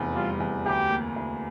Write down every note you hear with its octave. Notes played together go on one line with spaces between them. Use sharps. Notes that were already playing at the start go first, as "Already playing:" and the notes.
Already playing: F1 E2
G3 F4
E2
D2 G4
A#3
D2